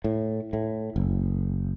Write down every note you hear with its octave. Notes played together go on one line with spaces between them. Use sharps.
A2
A2
F#1